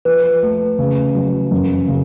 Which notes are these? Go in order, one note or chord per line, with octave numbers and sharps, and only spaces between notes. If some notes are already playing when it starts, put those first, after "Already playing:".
F3 B4
A3
C#3
F#3
F#2
C#3